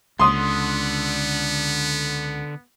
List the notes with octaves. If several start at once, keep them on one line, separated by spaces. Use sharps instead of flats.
C#2 D3 B3 C6 D#6